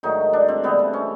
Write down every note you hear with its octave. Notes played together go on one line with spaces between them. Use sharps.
G#2 D#3 F#3 A3 D#4
D4
C4
C3 E3 G3 B3
C4
C#4